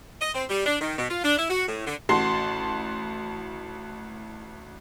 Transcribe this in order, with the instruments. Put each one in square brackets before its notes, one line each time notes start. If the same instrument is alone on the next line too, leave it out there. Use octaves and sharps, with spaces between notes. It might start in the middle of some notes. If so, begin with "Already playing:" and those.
[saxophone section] D#5
C4
G3
D4
D#3
B2
F4
D4
E4
F#4
A2
D3
[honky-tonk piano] A1 F#4 A5 C6 C7